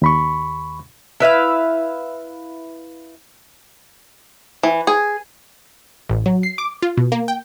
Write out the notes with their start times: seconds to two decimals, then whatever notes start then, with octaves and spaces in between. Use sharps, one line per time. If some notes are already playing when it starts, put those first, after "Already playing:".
0.02 D#2 B5 C#6
1.20 E4 B4 E5 F5
4.63 E3
4.87 G#4
6.09 A1
6.26 F#3
6.43 C7
6.58 D6
6.82 F4
6.97 B2
7.12 A#3
7.28 G5